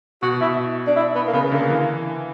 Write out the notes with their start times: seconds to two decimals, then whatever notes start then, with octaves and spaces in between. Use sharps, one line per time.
0.22 B2 F#4
0.41 B2 E4
0.87 D4
0.96 E4
1.15 B3
1.27 A#3
1.33 C#3 B3
1.52 D3 A#3
1.70 E3